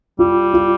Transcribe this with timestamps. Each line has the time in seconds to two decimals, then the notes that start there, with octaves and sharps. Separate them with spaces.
0.19 G3 F4
0.53 F4